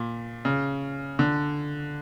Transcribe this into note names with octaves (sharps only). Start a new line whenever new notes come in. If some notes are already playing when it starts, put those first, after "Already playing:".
Already playing: A#2
C#3
D3